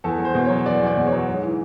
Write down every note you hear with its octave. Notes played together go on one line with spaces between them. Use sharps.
E2 A4
E2
C5
B2
C#5
F#3
E2 D5
E2
D5
B2
C#5
F#3
G#2
E3